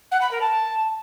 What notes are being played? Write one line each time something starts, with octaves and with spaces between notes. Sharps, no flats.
F#5
B5
A#4
A5